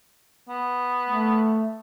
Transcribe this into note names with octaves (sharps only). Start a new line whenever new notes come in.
B3
A3